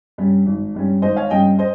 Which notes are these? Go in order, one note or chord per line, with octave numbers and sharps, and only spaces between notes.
G2 G3 C#4
G#1
G2 G3 C#4
G#1 C5 D#5
C#5 F5
G2 G3 C#4 D#5 G5
C5 D#5